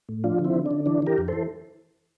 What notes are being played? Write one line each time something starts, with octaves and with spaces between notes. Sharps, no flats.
A2
F3 D4 F4
D3
C4 E4
D3
D3 D4
E3 D4
E3 G4 A#4
F2
E3 A4 C5